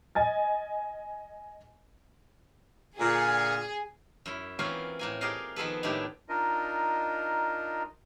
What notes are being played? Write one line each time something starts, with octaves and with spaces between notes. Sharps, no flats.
D#5 G#5 A6
A#2 D3 G#4
F#2 E4
E3 F#3 A#3 C4 C#4 F4
A2 A#3 G#5
G4 G#4 A#4 D5 D#5 F5
D#3 F3 B3 G#4 A4 B4
A2 D#3 G#3 D4 E4 G4
D4 D#4 F4 A#4 D#5